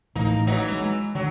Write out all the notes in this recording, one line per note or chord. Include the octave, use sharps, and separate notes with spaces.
A1 A2 A#3 D#4
E3 F#3 D#4
G#3
D3 F#3